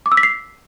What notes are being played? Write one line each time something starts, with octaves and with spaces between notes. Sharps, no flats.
D6
E6
B6
C7